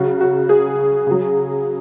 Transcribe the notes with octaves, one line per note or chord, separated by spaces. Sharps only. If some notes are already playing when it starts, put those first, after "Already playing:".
Already playing: C#3 F#3 F#4
F#4
G#4
C#3 F#3